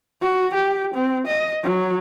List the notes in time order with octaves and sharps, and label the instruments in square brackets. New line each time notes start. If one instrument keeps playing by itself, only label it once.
[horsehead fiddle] F#4
G4
C4
D#5
F#3